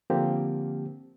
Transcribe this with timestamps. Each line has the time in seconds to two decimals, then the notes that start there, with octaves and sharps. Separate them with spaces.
0.10 D3 F3 A#3 C4 G4